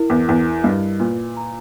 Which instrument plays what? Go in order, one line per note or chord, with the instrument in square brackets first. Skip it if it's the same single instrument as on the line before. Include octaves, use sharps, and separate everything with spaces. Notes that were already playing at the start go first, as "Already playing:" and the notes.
Already playing: [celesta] E4 A#4
[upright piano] E2
[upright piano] E2 [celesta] E4
[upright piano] G2 [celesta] D#5
[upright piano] A#2 [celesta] B4
[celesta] A#5